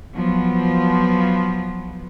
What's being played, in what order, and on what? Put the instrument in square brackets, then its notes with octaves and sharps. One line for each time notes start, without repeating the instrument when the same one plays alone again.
[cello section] F3 F#3 B3